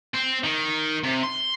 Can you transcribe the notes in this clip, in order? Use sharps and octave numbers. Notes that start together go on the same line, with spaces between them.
C4
D#3
C3
C6